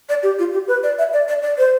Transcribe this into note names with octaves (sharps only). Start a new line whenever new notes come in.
D5
G4
F4
G4
B4
D5
E5
D5
D5
D5
C5